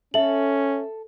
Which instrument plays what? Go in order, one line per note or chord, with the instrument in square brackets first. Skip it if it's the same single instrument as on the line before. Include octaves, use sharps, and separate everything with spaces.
[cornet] C#4 [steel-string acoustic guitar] A4 [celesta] E5 F#7